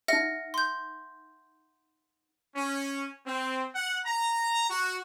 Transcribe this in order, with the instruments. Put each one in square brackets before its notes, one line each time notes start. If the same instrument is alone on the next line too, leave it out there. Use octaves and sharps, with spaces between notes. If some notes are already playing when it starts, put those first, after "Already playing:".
[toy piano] D#4 E5 [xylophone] F#5 F6 A#6
[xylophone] C6 G6
[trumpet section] C#4
C4
F#5
A#5
F#4